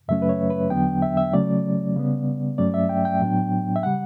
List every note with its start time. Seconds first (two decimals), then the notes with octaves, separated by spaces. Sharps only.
0.08 F#2 C#3 F#3 A3 C#4 E5
0.22 B4
0.29 C#5
0.50 B4
0.70 E2 D3 F#3 B3 D4 G5
1.02 E5
1.17 E5
1.33 C#3 F#3 A3 C#4 D5
1.96 C#3 G3 B3
2.58 G2 F#3 A3 C#4 D5
2.74 E5
2.89 G5
3.05 G5
3.20 A2 F#3 B3 D4
3.76 E5
3.83 C#3 G3 F#5